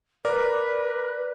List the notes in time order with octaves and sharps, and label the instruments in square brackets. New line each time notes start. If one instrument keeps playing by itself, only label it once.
[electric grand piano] A#4 [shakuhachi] B4 [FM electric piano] D5